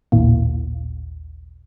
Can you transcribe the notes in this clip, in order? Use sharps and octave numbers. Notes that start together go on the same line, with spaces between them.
A1 D#2 A#2